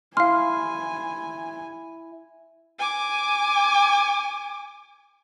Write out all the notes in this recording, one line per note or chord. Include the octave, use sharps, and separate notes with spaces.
E4 F5 G#5 C6 F6
G#5 D6